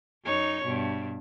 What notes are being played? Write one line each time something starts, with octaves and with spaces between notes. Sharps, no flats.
F#2 D#4 C#5
G2 B2